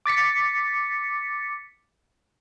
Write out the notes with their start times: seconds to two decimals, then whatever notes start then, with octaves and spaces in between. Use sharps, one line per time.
0.06 D6 A6 B6 C#7